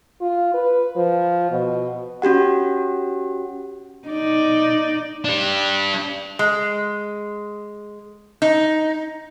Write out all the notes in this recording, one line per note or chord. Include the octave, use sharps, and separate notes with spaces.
F4
B4
F3
B2
C#4 F#4 G4 F#5
D#4 D5
D4 G4
G#3
D#4